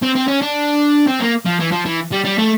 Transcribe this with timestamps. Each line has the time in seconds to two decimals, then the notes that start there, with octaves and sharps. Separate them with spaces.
0.02 C4
0.15 C4
0.28 C#4
0.42 D4
1.07 C4
1.20 A#3
1.45 F3
1.60 E3
1.72 F3
1.85 E3
2.12 G3
2.25 G3
2.38 A3